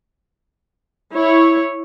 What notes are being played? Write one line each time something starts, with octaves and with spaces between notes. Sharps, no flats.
E4 C#5